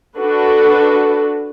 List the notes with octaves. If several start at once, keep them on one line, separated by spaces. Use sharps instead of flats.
D4 F#4 A4 B4